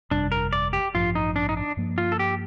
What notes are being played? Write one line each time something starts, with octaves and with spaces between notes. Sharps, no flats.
G1 F2 C3 G3 D4
A#4
D5
G4
A1 G2 F3 F4
D#4
D4
D#4
D4
G2 F3 A#3
F4
A4
G4